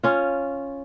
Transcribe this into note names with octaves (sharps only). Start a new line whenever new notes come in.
C#4 F4